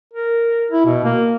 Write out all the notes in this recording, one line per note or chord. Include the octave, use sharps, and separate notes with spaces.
A#4
E4
B2
A#3